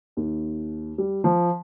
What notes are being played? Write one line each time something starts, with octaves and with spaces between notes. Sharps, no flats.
D#2
G3
F3